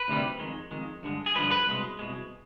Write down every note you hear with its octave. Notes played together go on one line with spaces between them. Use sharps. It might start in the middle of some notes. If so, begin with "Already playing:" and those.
Already playing: B4
D2 C3 D#3 G3
F2 D#3 G#3
F2 D#3 G#3
G2 D3 F3 G#3
G#4
G2 D3 F3 G#3 B4
B4
C2 B2 G#3
C2 B2 G#3